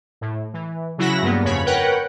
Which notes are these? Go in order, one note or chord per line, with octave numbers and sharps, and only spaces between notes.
A2
E3
C#3 F#3 E4 F#4 B5 A#6
G2 A#3 B3
F2 C#3 C#5 B5
A#4 B4 C#5 F#5 G5